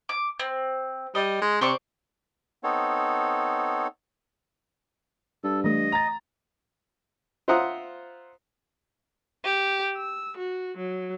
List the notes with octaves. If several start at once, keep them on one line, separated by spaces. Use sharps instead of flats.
D6
C4
G3 D#5
G#3
C3 C5 D5 C#6
B3 C4 D#4 A4 C#5
G2 A4
E3 A3 D#5
A#5 A6
F4 C5 E5 F#5 A#5 D#6
G4
E6
F#4
F#3